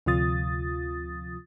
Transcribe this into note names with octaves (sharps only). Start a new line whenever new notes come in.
D2 C3 F3 F4 D#6 A6